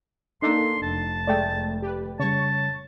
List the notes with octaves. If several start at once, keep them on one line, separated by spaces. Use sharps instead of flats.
A#3 D4 D#4 A4 C6
F1 A5
G#3 A3 D5 G5
G4 B4
C#3 G3 C#5 A5 C#6